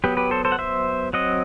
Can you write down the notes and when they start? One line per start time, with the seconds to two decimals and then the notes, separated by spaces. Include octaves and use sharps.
0.04 F#3 B3 G4 B4
0.17 G4 B4
0.31 A4 C5
0.45 A4 C5
0.52 F#5
0.59 C5 E5
1.13 F#3 C4 D#5 F#5